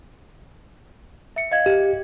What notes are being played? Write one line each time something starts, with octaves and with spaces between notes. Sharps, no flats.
E5 C#7
D#5 F5 G#6
G4